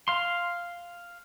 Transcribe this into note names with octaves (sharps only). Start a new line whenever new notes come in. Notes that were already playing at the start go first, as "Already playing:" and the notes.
F5 C6